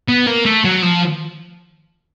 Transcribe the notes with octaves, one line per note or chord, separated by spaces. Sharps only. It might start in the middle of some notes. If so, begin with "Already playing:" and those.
B3
A#3
A3
F#3
F3